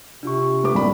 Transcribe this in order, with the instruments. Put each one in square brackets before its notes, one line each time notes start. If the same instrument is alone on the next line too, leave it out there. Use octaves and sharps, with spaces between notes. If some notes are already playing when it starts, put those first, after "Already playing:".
[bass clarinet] C3 [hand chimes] D4 F4 C#6
[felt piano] A3 B4 D6
[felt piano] C2 B5 [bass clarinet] G3